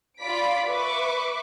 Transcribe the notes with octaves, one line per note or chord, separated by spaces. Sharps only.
F4 D5 B5 B6 D7
B4 E5 C#6 D6